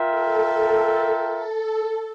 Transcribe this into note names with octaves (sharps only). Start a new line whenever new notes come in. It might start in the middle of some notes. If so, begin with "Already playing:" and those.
Already playing: F4 A#4 E5 G5
A4
A4